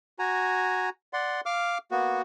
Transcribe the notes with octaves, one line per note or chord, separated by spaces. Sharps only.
F#4 G#5 A#5
D5 F#5 C6
F5 D6 F6
A#3 B3 F#4